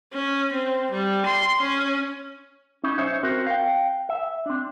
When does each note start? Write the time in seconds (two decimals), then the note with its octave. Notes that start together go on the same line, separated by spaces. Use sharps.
0.13 C#4
0.53 C4
0.91 G3
1.25 C6
1.61 C#4
2.84 C#4 D#4 E4
2.97 B1 C#4 D#4 C5 C#5 E5
3.23 C4 F#4 A#4 C5
3.46 F5 G5
4.09 E5
4.46 C4 D4